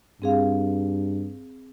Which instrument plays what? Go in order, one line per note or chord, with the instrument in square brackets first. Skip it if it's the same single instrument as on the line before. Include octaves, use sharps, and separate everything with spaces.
[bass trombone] G2 [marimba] C4 G#4 F5